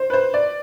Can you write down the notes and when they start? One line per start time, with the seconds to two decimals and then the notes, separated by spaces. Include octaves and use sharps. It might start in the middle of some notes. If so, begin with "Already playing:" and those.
Already playing: C5
0.10 B4
0.13 C5
0.34 D5